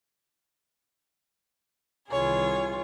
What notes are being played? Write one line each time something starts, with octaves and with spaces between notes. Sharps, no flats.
C2 D#3 E3 F4 G#4 C#5